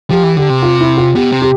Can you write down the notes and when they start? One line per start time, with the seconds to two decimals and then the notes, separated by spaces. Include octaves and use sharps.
0.10 F3 G4
0.23 E3
0.36 D3 G4
0.50 C3
0.63 F4
0.81 E4
0.97 F4
1.15 B2 G4
1.32 C3
1.42 G4